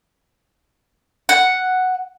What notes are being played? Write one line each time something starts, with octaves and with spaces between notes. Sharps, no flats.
F#5